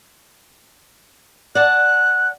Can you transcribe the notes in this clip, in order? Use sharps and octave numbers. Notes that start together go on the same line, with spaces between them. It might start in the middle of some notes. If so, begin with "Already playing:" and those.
D5 F#5 A5 F#6